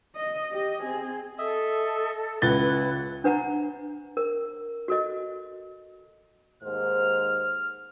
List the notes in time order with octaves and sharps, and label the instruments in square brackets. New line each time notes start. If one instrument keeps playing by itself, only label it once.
[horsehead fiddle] D#5
G4 D#5
C4 G#4
[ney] A4 [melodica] D#5 E5
[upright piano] C#2 A6 G7 [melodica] E4 F#5 [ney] B4
[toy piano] D4 B4 F#5 A#5
A#4
F#4 A4 D#5
[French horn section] D#2 G#2 C5 [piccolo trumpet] F6